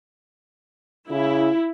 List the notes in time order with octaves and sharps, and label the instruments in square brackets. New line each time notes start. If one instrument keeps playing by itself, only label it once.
[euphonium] C#3 [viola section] E4